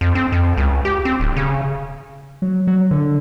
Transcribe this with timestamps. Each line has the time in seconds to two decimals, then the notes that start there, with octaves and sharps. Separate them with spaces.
0.01 F2
0.15 C4
0.32 F2
0.58 C#2
0.85 G4
1.05 C4
1.20 D1
1.36 C#3
2.42 F#3
2.67 F#3
2.91 D3